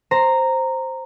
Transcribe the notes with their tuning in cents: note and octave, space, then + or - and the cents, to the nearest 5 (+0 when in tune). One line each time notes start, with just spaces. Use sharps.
C5 +5 A#5 -10